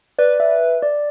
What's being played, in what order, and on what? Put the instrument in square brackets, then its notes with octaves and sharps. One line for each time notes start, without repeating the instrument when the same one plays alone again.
[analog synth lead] B4 [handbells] D5
[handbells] E5
D5